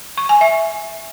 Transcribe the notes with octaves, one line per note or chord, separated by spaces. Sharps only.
C#6
G#5
E5